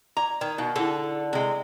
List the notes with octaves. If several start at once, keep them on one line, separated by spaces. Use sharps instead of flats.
D5 A#5 D6
D#3 D5
B2 D#4 F5 F#5
D3 E4 G#4 A4
C3 G#3